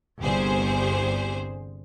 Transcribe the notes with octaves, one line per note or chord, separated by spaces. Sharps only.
G1 C2 G4 G#4 C5